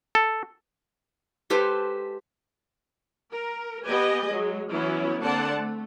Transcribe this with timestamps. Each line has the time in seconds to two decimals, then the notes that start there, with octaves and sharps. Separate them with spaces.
0.15 A4
1.50 G#3 G4 A4 B4 C5
3.33 A#4
3.85 B3 G4 B4 D#5 G#5
4.27 F#3 G#3
4.71 E3 F#3 B3 C#4 E4
5.22 D3 A#3 C4 D5 F#5 A5
5.52 A3